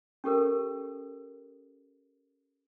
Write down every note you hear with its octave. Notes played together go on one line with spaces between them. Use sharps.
C#4 G4 A4 A#4